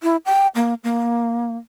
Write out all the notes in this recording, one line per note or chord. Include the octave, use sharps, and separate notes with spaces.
E4
G5
A#3
A#3